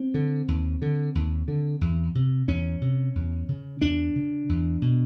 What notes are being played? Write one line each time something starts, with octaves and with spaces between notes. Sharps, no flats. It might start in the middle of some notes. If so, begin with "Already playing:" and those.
Already playing: C4
D3
D#2
D3
D#2
D3
E2
C3
E2 C#4
C3
E2
C#3
E2 D4
C#3
E2
B2